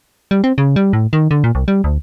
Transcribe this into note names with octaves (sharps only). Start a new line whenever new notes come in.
G3
C4
C#3
G3
A2
D#3
D3
A#2
C2
G3
D2